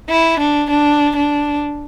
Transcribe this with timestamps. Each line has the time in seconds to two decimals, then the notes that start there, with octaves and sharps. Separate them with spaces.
0.10 E4
0.40 D4
0.70 D4
1.16 D4